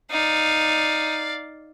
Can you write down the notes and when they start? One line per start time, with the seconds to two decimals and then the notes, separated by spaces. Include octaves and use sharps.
0.11 D#4 D5 F5